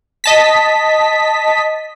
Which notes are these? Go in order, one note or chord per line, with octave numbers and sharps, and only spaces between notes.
D#5 A5 B6